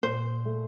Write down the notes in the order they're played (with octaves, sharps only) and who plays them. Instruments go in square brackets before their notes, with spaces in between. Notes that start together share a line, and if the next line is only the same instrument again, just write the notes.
[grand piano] A#2 [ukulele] C5
[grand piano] A3